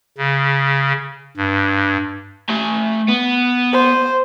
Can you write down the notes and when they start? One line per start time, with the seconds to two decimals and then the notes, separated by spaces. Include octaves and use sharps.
0.18 C#3
1.37 G2
2.49 A3 G#5
3.08 B3
3.73 C5